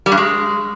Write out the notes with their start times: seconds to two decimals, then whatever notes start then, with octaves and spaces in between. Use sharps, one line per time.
0.06 G3
0.12 G2
0.17 G#3